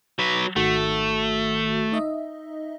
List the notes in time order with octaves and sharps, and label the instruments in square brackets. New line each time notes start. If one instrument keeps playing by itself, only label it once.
[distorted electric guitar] F#3 B4
[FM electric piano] G#1 D#3 F#4 [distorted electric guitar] A3
[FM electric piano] D#4 D#5 E5